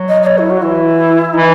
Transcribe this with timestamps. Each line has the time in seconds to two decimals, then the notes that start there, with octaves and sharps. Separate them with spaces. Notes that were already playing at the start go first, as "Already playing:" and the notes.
Already playing: F#3
0.09 D#5
0.22 D#5
0.26 C#5
0.38 E4
0.50 F#4
0.58 F#3
0.62 E3 E4
1.34 E3 D#4